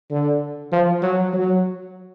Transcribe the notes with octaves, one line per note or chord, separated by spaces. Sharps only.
D3
F3
F#3
F#3